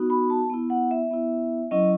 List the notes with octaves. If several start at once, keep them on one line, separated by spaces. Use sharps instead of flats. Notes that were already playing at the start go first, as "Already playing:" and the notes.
Already playing: B3 D#4 F#4
B5
A5
B3 E4
F#5
E5
B3 E4
F#3 C#4 E4 D#5